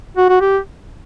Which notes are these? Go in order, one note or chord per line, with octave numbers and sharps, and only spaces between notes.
F#4
F#4
G4